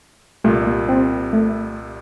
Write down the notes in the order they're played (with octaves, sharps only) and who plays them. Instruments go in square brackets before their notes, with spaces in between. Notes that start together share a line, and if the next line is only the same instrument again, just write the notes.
[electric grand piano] C2 A#2 G3 [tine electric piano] A3
[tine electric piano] A#3
C4
A3